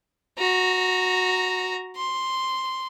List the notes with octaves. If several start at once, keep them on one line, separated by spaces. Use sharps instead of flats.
F#4 A#5
C6